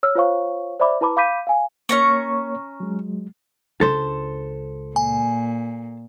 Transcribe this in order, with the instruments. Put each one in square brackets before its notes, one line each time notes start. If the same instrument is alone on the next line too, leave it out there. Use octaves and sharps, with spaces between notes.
[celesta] C#5 E6 F6
F4 C5 C#5 F5 C#6
C5 D5 E5 B5 D6
E4 B4 A5 B5 D6
F5 B5 D6 G6 B6 D#7
F5 G#5
[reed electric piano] A#3 C#5 [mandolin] C#4 A#5 C#6
[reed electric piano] F#3 G#3
[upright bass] C#2 D4 [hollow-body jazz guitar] A4 C5
[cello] A#2 [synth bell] G#5